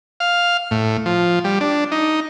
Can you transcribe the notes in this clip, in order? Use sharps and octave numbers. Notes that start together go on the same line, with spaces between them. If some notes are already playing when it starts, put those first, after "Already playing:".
F5
A2
F3
G3
D4
D#4